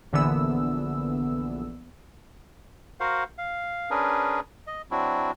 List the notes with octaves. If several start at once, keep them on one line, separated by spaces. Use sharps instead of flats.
A#1 D3 E3 B3 E6
F#4 A#4 C5 F5 F#5
F5
C#4 D4 G#4 A#4 B4
D#5
F#3 C4 D4 E4 F#4